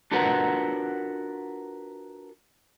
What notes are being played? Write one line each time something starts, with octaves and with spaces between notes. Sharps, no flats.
D4 F4 F#4 A#4 B4 F#5